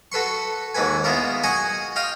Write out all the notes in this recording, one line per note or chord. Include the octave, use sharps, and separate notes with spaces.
F#4 A4 B4 C6 C#6
D#2 G#2 F#4 B4 G#5
G#3 B3 E4 F4 A#4
F#4 G#4 D#5 G#5 C#6 D#6
D#5 F5 G5 C6 D#6